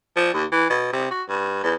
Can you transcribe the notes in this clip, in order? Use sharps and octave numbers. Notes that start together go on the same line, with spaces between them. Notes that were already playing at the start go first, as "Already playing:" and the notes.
F3
D#2
E3
B2
C3
F#4
G2
E2